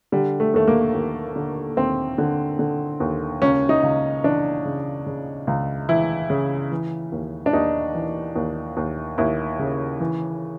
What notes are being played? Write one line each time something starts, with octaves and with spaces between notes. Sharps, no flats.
D3 G3
A3
D#2 A3
A#3
D#2
D3
D#2 C4
D3
D3
D#2
C#2 C#4
D#4
C#2
E3 D4
C#3
C#3
C#2
E3 E4
C#3
E3
D#2
D4
D#2 D#4
E3
D#2
D#2
D#2 E4
C#3
E3